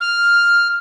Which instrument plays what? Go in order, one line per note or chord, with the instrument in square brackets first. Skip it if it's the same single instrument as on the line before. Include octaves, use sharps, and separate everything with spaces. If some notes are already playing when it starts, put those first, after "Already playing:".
[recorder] F6